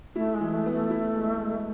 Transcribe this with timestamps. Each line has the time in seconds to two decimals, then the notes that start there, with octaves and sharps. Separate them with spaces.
0.15 A3 E4
0.34 G#3
0.41 E3
0.53 A3
0.66 B3
0.72 A3
0.90 E4
1.15 G#3
1.40 G#3